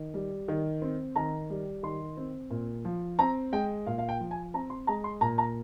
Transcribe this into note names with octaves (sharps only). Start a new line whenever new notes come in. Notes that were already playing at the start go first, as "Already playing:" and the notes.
Already playing: D#3
G3
D#3
C4
D#3 A#5
G3
D#3 C6
C4
A#2
F3
C4 A#5
G#3 G5
A#2 F5
F5
G5
F3
G#5
C4 A#5
C6
G#3 A#5
C6
A#2 A#5
A#5